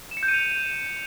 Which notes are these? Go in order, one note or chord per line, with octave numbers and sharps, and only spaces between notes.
E7
C#7
G6
D#7
F7